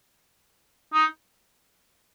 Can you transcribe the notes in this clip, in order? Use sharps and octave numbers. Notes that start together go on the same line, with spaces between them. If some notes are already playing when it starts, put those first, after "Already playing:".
D#4